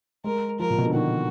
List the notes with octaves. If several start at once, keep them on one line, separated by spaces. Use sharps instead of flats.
G#3 A#4
F3 A#4
A#2
B2
D3
D#3 F#4